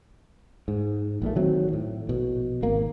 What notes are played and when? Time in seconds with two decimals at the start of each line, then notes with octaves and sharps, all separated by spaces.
0.68 G#2
1.22 A#1 A#2 A3
1.36 D#3 F#3 C4
1.73 A2
2.07 A#1 B2
2.62 G#1 A#3